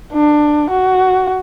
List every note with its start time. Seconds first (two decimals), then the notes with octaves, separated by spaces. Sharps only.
0.13 D4
0.70 F#4